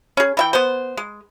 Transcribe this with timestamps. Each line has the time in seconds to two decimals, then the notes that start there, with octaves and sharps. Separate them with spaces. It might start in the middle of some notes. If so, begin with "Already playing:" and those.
0.17 C#4 G#4
0.37 E3 E5 G5
0.53 B3 C5
0.97 G#3